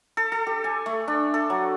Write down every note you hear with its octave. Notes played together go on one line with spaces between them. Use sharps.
A4
A4
G4
G#5
A3
D4
A4
F#3